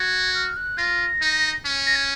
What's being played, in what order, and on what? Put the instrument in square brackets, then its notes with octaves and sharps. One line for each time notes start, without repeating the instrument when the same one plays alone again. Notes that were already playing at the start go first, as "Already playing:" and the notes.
Already playing: [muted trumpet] F#4 [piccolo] G#6
[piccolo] F6
F#6
[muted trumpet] F4 [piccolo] A#6
[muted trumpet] D#4
C#4
[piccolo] A#6
G#6